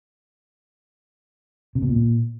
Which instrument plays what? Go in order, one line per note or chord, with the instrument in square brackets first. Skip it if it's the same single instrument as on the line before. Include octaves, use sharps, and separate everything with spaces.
[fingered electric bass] C3
B2
A#2